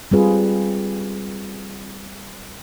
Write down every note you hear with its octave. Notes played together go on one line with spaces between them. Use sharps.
G3 C4 F4 G#4 B4